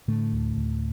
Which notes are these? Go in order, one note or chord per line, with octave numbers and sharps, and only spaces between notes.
A2 D3 A3
D2
D2